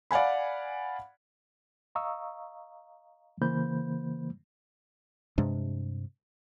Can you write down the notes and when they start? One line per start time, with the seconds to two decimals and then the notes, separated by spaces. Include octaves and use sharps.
0.11 D5 F5 F#5 G#5 B5
1.95 D#5 F5 A#5 C#6 D#6 E6
3.41 C#3 E3 A#3 C5 B5 G6
5.38 G2 C3 G#3 D4